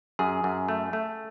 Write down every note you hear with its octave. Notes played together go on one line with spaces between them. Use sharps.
F#2 G#4
F#2
A3
A3